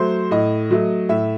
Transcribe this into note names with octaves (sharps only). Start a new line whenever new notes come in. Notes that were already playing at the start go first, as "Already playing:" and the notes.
Already playing: F#3 A3 C5
A2 D#5
F#3 A3
A2 E5